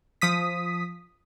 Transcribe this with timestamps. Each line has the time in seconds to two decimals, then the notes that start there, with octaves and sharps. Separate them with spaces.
0.21 F3 D#6 B6